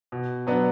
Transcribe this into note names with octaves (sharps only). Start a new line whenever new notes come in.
B2
F#3 B3 D4